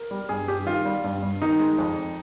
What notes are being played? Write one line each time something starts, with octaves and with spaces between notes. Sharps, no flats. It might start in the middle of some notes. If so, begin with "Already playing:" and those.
Already playing: A#4
G3
G2 G#4
G2 G4
D#3 F4
G3
G2
G2
D#3 D#4
G#3
F2